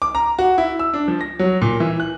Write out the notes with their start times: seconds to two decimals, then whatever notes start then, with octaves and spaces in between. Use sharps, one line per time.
0.02 D6
0.15 A#5
0.39 F#4
0.58 E4
0.79 E6
0.94 D4
1.08 F3
1.21 A#6
1.39 F#3
1.62 A#2
1.80 E3
2.00 F#6